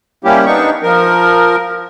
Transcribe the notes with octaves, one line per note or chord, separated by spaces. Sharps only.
G3 A#3 C#4 E4 G4
B3 D4 D#4 C#6
F3 A#4